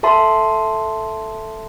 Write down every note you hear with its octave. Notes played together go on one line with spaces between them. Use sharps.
A4 E5 A5 C6